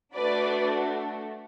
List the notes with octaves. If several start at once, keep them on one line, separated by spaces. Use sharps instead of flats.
A3 D4 F#4 B4 D5